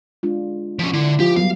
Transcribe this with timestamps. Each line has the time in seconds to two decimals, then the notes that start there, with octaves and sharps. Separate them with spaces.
0.23 G#3 D4 F4
0.79 F3 C#4
0.93 D3 E4
1.20 F3 G4
1.36 F#3 G3 B3 F5